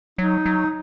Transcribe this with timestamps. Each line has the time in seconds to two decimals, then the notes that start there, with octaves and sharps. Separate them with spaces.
0.18 F#3 D#4
0.46 F#3